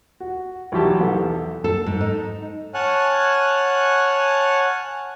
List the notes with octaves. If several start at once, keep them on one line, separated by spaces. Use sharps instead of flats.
F#4
B1 E3 F#3 G4 A5
E2 A4
A4
G#2
D#4
C#5 F#5 G#5 A5 F6 F#6